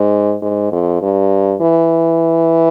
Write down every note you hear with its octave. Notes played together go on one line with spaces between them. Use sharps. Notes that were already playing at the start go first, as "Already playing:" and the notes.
Already playing: G#2
G#2
F2
G2
E3